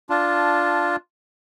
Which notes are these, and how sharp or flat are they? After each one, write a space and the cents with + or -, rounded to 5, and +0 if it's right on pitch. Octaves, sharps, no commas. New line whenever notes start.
D4 +0 F4 +0 A5 -5